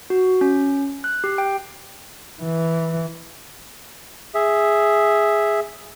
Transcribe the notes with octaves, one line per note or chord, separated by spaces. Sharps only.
F#4
C#4
F#6
G4
G5
E3
G#4 E5